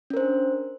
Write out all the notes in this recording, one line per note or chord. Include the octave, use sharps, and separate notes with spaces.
C#4 D4 A#4 C5